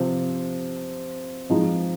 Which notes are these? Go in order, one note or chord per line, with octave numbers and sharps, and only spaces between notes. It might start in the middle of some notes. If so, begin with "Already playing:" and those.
Already playing: C3 F3 C4
F3 G#3 C4 D#4